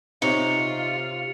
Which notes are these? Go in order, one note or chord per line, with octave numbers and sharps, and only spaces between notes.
C3 D#4 F4 C#5 C#7 F7